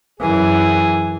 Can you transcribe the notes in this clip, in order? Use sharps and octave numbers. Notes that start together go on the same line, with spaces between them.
F#2 E3 G#4